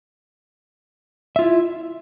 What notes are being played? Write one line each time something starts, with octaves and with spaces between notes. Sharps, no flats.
E4 F4 E5